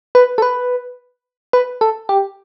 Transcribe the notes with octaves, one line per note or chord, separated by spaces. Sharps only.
B4
A4
B4
B4
A4
G4